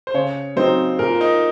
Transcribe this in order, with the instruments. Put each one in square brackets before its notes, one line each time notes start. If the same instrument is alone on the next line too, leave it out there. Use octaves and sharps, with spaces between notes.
[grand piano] C5
[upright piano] C#3 [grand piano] C#5
[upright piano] F#3 C4 D#4 [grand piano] C5
[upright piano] A#2 [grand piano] A#4
[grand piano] D#4